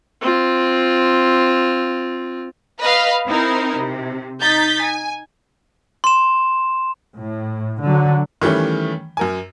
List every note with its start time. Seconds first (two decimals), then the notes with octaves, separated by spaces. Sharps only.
0.21 C4 F4
2.81 B4 D#5 F5 B5
3.26 C4 D#4 E4 A#4
3.75 C3
4.41 D#4 G6 A6 B6
4.81 G#5
6.04 C6 E7
7.18 A2
7.83 D3 F#3
8.42 D#3 E3 G3 A3 C#4
9.17 F#2 A#4 G#5